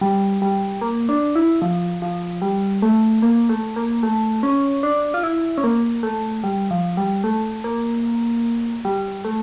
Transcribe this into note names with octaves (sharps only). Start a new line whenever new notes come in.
G3
G3
A#3
D4
E4
F3
F3
G3
A3
A#3
A3
A#3
A3
C#4
D4
F4
E4
C#4
A#3
A3
G3
F3
G3
A3
A#3
G3
A3